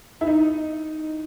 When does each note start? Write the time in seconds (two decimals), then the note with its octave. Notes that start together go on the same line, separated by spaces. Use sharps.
0.21 E4
0.27 D#4